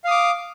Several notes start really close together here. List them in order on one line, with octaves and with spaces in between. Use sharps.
F5 D#6 D6